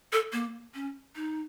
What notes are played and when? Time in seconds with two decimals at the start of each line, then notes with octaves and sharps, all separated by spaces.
0.12 A4
0.32 A#3
0.74 C#4
1.16 D#4